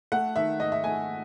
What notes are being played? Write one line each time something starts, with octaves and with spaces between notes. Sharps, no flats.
A3 F#5
D#3 E5
G#2 D#5
E5
A3 G#5